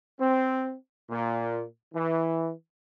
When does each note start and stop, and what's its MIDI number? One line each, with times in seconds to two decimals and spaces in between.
0.18 0.75 60
1.10 1.63 46
1.94 2.51 52